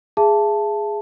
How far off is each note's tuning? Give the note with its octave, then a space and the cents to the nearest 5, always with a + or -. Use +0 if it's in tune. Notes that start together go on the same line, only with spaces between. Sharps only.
G#4 +0 E5 +35 A5 +0